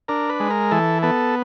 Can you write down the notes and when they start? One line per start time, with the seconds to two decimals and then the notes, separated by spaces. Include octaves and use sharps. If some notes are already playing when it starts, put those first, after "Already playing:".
0.08 D4 A#4
0.29 B4
0.40 G#3
0.50 A#4
0.71 E3 A4
1.02 B3 A4